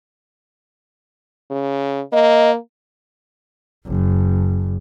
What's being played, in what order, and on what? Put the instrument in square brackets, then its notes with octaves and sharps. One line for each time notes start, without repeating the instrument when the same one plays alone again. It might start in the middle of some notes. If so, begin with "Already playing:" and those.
[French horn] C#3
[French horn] A#3 [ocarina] D#5
[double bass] F#1